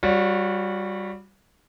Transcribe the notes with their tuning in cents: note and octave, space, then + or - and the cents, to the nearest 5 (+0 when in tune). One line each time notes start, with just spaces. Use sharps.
G3 +0 F#4 -35 C#5 +0